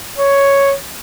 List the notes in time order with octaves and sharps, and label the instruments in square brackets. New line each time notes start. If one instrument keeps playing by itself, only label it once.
[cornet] C#5